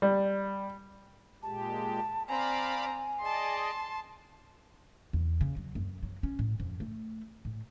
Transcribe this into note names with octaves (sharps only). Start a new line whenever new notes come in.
G3
A#2 G#3 G4 A5
C4 D5 F5 G#5 A#5 B5
G#4 D5 D#5 A5 C6
E2
C#3
F#3
F#2
F#3
C#4
A2
F2
A3
A2